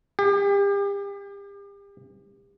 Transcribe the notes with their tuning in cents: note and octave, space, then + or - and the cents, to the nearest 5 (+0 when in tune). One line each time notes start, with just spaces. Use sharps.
G4 +35